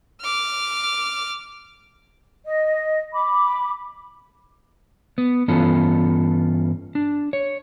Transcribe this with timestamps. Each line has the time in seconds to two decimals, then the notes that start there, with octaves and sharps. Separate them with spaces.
0.22 D6 F6
2.45 D#5
3.13 B5 D6
5.18 B3
5.48 G2 E3 B3 C#4 F4 A4
6.95 D4
7.33 C#5